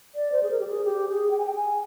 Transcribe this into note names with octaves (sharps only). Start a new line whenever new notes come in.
D5
C5
G#4
A#4
G4
G#4
G4
G#4
G5
G#5
G5
G#5